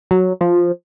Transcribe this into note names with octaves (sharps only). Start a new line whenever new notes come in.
F#3
F3